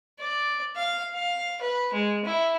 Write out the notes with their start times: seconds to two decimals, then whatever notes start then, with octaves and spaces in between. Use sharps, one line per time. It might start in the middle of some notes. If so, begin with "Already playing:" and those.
0.20 D5
0.76 F5
1.14 F5
1.61 B4
1.93 G#3
2.25 E4